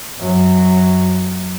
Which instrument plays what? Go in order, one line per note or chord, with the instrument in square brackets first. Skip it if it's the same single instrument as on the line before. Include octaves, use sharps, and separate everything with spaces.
[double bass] F#2 F#3